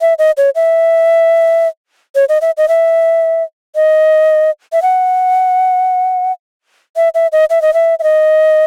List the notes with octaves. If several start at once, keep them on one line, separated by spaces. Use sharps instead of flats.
E5
D#5
C#5
E5
C#5
D#5
E5
D#5
E5
D#5
E5
F#5
E5
E5
D#5
E5
D#5
E5
E5
D#5